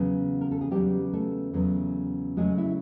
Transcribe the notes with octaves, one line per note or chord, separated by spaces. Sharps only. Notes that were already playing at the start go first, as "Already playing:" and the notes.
Already playing: E2 C#3 F#3 B3
A#4
A4
G#4
E2 C#3 F#3 G3 B3 G4
A3 A4
E2 C#3 F#3 B3
C#3 F#3 G#3 A3 G#4
E4